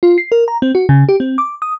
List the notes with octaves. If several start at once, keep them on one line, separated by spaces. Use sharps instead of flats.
F4
C7
A#4
A#5
C4
F#4
C#3
G4
C4
D6
D#6